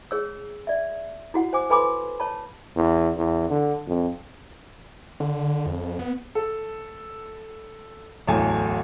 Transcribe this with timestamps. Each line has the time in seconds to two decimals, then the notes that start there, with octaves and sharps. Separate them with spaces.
0.11 G#4 C#5 E6
0.67 D5 E5
1.34 E4 F#4 F#5
1.53 C5 G#5 D6
1.70 A4 B4 G#5 B5 C6 D6
2.20 C#5 A5 B5
2.76 E2
3.17 E2
3.50 D3
3.87 F2
5.20 D3
5.66 F2
5.99 B3
6.35 A4
8.28 D1 A1 E2 G#5 A5